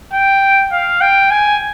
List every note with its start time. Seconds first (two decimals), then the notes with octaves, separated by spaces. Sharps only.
0.13 G5
0.72 F5
1.01 G5
1.31 G#5